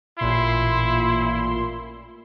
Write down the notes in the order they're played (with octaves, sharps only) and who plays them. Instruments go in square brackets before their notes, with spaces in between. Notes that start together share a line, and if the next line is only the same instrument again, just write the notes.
[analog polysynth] A1 A#2 C6 [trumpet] E4